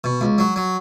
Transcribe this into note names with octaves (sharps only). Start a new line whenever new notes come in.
B2
C#2
F#3
F#3